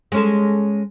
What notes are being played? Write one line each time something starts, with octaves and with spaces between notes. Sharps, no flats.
G#3 C#4 A4